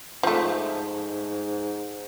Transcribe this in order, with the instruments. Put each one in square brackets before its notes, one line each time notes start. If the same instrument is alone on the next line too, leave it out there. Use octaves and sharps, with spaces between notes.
[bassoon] G#2 [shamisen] F3 A3